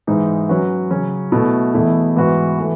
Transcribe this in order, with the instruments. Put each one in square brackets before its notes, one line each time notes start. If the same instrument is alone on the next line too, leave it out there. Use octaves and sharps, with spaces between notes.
[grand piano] G#2 E3 G#3 D#4
F#3 C#4 F#4 B4
C#3 F#3 C#4
B2 A3 E4
E2 B2 A3 E4
G#2 E3 B3 F#4
E3 A3